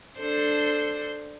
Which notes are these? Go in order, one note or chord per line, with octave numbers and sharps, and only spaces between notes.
D4 A4 C5